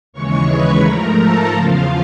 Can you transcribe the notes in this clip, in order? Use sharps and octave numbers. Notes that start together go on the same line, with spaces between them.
D#2 C#3 E3 G#3 C#5 C#6
B4 B5
G#2 F3 A3 A#4 A#5
A4 A5
E2 C#3 F3 F4 F5